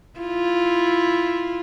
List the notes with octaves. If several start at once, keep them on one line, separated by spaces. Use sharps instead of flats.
E4 F4